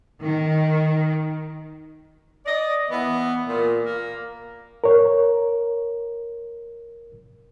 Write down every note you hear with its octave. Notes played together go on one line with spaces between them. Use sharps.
D#3
D5 D#5
E3 B3
A#2
A#3
A#4 C#5